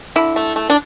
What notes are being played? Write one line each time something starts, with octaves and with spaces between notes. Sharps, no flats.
D3 E4
A3
A3
D4